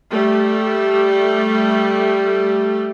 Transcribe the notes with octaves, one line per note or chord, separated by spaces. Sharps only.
G3 A3